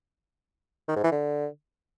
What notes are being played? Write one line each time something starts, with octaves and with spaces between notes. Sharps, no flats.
D#3
G#2
E3
D3